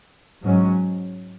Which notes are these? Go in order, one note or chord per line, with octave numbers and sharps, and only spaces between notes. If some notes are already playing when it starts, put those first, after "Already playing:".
G#2 F#3 C#4